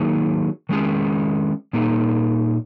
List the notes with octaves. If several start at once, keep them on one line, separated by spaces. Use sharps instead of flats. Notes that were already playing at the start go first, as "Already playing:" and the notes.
Already playing: D#3 F#3 A#3 D#4 G#4
D#3 G#3 C#4 G#4
A#2 A#3 D#4 G#4